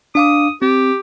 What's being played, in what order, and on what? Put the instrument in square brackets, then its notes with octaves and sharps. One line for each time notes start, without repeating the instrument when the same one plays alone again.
[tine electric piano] D4 F5 D6 [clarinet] D#6
[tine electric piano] C4 [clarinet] G4